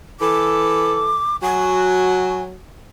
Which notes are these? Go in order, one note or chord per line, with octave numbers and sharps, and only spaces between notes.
E3 A4 D6
F#3 F#4 G#5